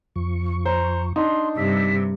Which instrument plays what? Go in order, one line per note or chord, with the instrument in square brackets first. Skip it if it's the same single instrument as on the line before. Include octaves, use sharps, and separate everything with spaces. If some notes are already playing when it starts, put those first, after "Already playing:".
[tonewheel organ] F2 F3 C#6
[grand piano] C5 [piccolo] A#5
[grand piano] D4 D#4 [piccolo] C6
[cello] G2 C3 [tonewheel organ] E6 [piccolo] B6